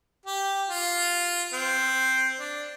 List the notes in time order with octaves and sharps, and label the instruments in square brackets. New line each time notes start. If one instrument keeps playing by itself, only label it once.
[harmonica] G4
F4
C4
D4